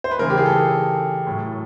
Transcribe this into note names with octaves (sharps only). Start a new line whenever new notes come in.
C5
B4
C#3 E3 A#4
G4
G#4
A4
A2 F#3